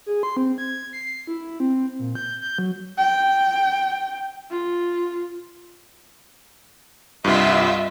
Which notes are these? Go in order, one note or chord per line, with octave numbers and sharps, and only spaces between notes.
G#4
C6
C4
G#6
C7
E4
C4
A#2
G6
G6
F#3
G5
F4
C2 G2 F4 D#5 E5